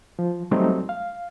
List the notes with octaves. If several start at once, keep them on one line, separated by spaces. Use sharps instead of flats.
F3
F#3 G3 A3 C4 D#4
F5